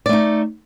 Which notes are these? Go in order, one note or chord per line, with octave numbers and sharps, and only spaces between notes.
A3 D#4 D5